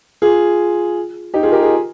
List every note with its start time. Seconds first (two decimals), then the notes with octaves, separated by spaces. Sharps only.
0.22 F4 G#4
1.34 D#4 G4
1.43 F4 G#4
1.52 G4 A#4
1.61 F4 G#4